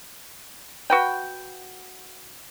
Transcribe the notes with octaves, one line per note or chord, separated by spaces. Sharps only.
F#4 B4 G5